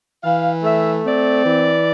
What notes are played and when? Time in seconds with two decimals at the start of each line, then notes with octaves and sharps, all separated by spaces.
0.23 E3 F5
0.63 A3 E5
1.05 C4 D5
1.46 E3